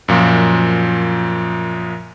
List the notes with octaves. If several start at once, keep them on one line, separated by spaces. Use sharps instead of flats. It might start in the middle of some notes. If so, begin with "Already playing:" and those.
F#2 A#2 F3